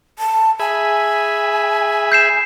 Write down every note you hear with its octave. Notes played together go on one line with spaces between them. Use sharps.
A5
G#4 E5 G#5 B5
G6 C7 E7